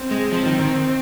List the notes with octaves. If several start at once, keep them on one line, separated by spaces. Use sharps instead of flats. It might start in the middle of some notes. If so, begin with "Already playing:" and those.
Already playing: C4
G#3
F3 C4
D#3
D#3